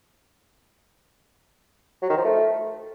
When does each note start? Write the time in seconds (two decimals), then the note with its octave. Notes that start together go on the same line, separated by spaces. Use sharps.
2.02 F#3
2.09 D#3
2.17 F3
2.24 A3